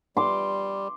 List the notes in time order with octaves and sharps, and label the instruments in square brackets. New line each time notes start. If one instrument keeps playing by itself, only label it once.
[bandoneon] G3 [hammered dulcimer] C6 D6